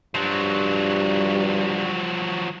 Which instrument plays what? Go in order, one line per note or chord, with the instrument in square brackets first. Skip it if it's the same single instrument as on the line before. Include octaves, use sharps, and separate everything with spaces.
[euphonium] G2 [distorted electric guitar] F3 F#3